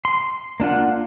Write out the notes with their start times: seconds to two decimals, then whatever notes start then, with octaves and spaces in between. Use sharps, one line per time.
0.05 C6
0.60 A#3 D4 F4 F#5